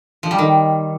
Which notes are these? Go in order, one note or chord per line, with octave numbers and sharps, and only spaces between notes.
F3
G3
D#3